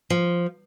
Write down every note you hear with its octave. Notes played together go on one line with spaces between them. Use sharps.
F3